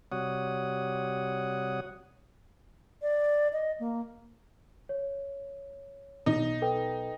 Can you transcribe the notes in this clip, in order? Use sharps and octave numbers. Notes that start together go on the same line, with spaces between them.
C3 G3 F#4 C#5 F#5 D#6
D5
D#5
A#3
C#5
B1 D#4 A#6
A4 B4 G5